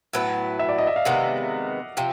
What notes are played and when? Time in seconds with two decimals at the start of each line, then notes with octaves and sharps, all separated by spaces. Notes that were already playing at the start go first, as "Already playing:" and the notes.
0.13 A2 F#3 B3 E4
0.59 E5
0.68 D5
0.78 D#5
0.87 E5
0.96 F5
1.05 C3 D#3 G#3 B3 F#5
1.97 C3 F3 G5